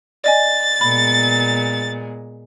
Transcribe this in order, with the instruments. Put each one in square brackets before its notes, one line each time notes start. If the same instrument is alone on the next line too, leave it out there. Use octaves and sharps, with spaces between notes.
[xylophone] D5 D#5 G#5 [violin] A6
[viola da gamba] A#2 G#3 B3 [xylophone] B5